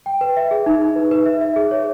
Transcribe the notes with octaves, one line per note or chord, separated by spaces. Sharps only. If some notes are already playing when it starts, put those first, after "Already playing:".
G5
B4
E5
G#4
D#4
D#4
B4
B4
E5
E5
G#4
C#5